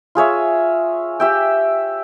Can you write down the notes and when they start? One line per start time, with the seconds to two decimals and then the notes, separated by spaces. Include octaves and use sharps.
0.15 F4 G#4 C#5 E5
1.20 G4 E5 G5